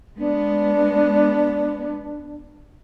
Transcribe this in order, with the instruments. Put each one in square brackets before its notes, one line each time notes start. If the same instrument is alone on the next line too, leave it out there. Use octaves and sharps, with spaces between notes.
[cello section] G#3 B3 [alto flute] D4